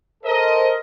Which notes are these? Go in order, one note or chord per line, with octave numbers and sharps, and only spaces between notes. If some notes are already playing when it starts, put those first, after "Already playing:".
A4 A#4 C5 D#5